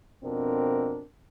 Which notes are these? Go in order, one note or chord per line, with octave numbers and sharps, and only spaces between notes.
F2 B2 C4 D4 A#4